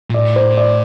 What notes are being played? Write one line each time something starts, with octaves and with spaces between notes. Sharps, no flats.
A#2
A2 D5
C5
D5